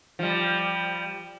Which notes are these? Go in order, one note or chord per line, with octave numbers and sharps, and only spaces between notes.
F3 G3